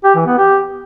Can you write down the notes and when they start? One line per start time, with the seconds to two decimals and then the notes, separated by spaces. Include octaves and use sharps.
0.04 G4
0.15 E3
0.26 B3
0.38 G4